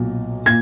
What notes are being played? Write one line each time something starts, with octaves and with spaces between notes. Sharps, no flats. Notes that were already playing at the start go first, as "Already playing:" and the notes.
Already playing: B1 A#2 F#3
A#2 G#6